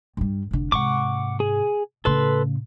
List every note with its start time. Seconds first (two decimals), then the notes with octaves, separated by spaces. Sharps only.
0.17 G2 G3
0.51 F1 D3
0.72 G#2 C3 F#5 C#6 D6
1.40 G#4
2.05 A2 C#3 A4 B4 C6